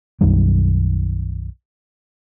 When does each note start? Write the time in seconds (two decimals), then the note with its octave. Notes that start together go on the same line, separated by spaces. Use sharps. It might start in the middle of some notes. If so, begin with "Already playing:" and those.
0.21 B1 F#2 D#3 G3